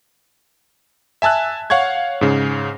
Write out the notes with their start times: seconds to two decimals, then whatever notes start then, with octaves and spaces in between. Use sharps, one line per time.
1.22 E5 G#5 A5 E6 F#6
1.70 C#5 F5 F#5 C#6 G#6
2.21 G#2 C#3